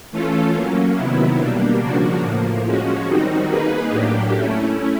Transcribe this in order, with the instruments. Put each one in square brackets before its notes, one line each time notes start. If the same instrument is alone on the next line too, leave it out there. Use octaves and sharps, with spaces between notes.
[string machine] E3 A3 C#4 F4 A4
F#3 A#3 C#4
C3 D#3 F#3 B3 E4
B2 G3 A#3 D4
C#3 F3 A#3 D4 F#4
A2 F3 A#3
F3 G#3 C#4 F#4
D#3 G3 C4 D#4 F#4
A#3 D#4 G#4 B4
A2 F#3 A#3 D4 G4
A3 C#4 E4